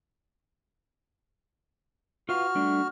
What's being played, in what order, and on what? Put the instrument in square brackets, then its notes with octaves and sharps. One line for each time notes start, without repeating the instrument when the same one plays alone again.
[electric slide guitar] F4 B4 F5 [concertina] F#4 F6
[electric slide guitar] G3 A3 D4